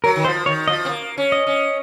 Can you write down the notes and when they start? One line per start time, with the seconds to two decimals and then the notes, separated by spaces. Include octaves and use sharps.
0.04 F#3 A#4
0.16 D#3
0.25 F3 C5
0.46 D#3 C#5
0.68 F3 D#5
0.85 C4
0.89 A#3
1.17 C#4
1.32 D#5
1.47 C#4